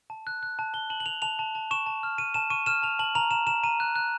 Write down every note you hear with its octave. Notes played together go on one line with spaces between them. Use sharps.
A5
F#6
F#6
A5
A5 G7
A5 F#7
F#7
A5 F7
A5 F7
A5
A5
C#6 E7
A5
F6
A5 D#7
A5 E7
C#6 D#7
F6 E7
A5 F7
A5 F#7
A#5 F7
A#5 E7
A#5 E7
A#5 D#7
F#6
F#6